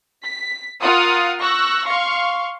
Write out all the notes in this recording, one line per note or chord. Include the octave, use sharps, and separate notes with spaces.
B6
F4 A#4 F5 F#5 D#6
C#6 E6 F#6 A#6
F5 C6 C#6